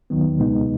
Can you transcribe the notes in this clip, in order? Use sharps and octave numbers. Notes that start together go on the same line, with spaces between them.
D#2 D#3 F#3 B3
C#2 B2 G#3 B3 D#4